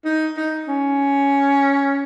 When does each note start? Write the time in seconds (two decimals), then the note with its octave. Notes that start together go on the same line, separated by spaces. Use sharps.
0.05 D#4
0.37 D#4
0.68 C#4